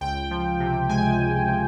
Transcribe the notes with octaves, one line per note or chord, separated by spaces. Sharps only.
C#2 G5
F3
C3
G#3 G#5
C#2
F3